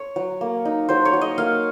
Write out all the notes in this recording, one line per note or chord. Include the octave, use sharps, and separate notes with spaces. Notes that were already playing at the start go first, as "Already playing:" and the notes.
Already playing: C#5
F#3
A#3
D#4
F#3 C5
C#5
F#3
D#5
A#3 F5